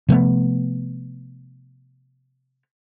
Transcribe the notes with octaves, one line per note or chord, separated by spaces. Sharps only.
C3 F3 A3 B3